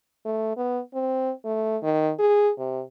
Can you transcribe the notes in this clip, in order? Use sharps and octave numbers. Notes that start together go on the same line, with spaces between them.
A3
B3
C4
A3
D#3
G#4
C3